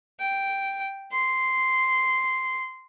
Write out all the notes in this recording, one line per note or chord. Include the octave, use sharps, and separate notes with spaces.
G5
C6